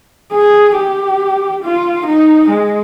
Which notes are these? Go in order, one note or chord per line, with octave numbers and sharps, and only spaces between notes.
G#4
G4
F4
D#4
G#3